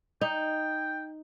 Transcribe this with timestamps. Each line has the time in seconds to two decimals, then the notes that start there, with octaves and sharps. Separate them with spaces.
0.21 D#4 G5